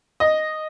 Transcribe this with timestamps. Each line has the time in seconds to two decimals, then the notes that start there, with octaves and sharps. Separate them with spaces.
0.20 D#5